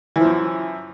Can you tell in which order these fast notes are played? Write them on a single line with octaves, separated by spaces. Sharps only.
E3 F3 F#2